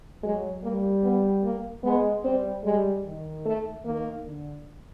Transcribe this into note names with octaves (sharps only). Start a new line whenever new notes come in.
F#3 G#3
G3 A#3
B3
A#3
G#3 B3
G3 C4
G3 G#3
D#3
A3
D#3 A#3
D3